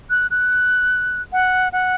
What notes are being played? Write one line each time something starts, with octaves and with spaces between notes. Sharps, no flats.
F#6
F#6
F#5
F#5